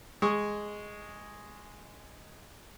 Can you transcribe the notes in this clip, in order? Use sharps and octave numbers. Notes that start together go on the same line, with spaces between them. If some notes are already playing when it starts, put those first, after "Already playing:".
G#3 C#6 D#6